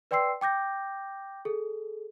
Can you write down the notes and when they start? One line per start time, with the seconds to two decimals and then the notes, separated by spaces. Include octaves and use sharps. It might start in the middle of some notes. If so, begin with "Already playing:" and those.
0.11 B4 D5 G5 C6 E6 C7
0.41 G5 D6 G6 A#6
1.45 G#4 A4